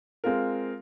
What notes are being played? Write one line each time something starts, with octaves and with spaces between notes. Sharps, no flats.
G#3 C4 F4 A#4